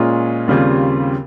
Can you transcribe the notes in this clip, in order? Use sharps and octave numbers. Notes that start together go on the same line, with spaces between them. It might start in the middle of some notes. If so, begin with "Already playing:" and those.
Already playing: A#2 G#3 C#4 F4 G#4
D#2 C#3 G3 C4 F4